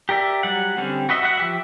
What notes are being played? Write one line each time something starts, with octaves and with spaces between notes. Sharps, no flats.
G4 A#4 D5 E5
F#3 G3 F#5
D3 G3 C4 C#4
F#4 B4 D#5 E5
F#4 B4 E5 F#5
F3 G4 E5